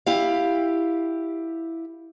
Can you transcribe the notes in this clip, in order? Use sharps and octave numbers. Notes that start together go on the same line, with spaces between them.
E4 G4 F5